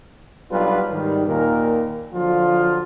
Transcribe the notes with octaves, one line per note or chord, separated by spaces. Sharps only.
B1 F#3 G3 D4 F4 B4
G#2 D#3 G3
D#2 A#2 A#4
D3 F3 F#3 F4